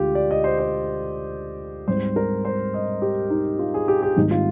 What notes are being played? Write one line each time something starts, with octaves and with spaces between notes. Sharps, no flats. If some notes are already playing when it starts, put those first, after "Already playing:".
Already playing: D2 D3 G#3 F4 G4
D5
D#5
C5
C5
G#2 G3 C4 C5
A#4
C5
D#5
G4
D#4
F4
G#4
G4
G4
G#1 G#2 G3 A#3 D#4
F4